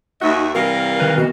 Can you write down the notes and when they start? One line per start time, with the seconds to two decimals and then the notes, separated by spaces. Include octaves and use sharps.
0.21 D#2 D#4 F#4 E5
0.55 C3 E3 G3 A#4 F5
1.00 D#3 B4
1.18 B2 F#4